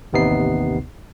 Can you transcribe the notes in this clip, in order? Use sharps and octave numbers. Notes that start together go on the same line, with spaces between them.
A1 D#2 C3 B3 D#4 C7